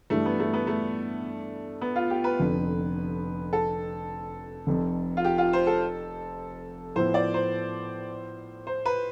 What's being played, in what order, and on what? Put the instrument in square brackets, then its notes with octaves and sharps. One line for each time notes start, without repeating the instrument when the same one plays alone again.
[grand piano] G2 E3 G3 [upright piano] A3
[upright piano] B3
A3
B3
A3
B3
F4
G4
B4
[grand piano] F1 F2 D3
[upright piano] A4
[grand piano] F1 F2 C3
[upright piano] F4
G4
F4
C5
A4
[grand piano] A2 F3 B3 E4 [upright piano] C5
[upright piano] D5
C5
C5
B4